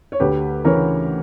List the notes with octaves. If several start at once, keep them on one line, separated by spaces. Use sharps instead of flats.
C#5
D2 G4 B4
C#3 E3 A#4 C#5